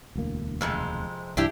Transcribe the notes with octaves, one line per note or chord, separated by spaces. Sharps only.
E1 D2 A#3
F2 C3 G#3
C2 G2 F3 D4 E4 G4